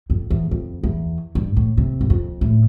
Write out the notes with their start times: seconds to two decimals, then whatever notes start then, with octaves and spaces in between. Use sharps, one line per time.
0.10 F2
0.30 E2
0.51 F2
0.83 E2
1.35 G2
1.56 A2
1.77 C3
2.01 G2
2.10 F2
2.41 A2